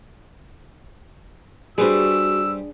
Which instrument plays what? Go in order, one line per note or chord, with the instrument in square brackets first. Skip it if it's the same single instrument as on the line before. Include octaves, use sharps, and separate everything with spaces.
[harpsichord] G3 B4 C5 [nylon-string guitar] D4 G#4 [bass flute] F#4 [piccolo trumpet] E6